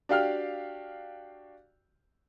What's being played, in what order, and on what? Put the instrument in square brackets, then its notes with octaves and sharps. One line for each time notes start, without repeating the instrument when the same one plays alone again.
[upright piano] D4 F#4 G4 F5 G5 F6